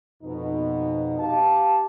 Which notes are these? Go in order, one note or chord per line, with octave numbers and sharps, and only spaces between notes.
F2 B2 D#4
G4 F5 A5